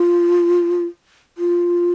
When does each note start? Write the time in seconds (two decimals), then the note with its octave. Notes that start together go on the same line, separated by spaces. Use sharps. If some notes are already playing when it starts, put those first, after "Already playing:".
Already playing: F4
1.38 F4